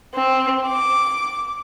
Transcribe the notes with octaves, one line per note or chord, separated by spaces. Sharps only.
C4
D6